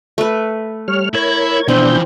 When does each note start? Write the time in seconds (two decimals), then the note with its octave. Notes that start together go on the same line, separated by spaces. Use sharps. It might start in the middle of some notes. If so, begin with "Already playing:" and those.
0.18 A3 B4
0.88 G3 C#5 F6
1.15 E4 A#4 C#5 G#6
1.68 B2 E3 F3 C4 D4 G6